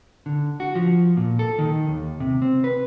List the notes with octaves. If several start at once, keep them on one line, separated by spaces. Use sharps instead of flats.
D3
F#4
F3
A#2
A4
D#3
D#2
C3
C4
B4